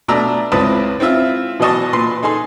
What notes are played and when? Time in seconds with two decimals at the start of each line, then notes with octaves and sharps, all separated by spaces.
0.08 B2 A3 D4 D5 A#5 E6
0.52 C#2 C4 E4 B4 A5 D#6
1.00 C4 E4 F4 E5
1.60 B2 E3 F#3 D#5 A5 C#6
1.93 A#2 B4 C6
2.23 D#4 G#4 A4 C6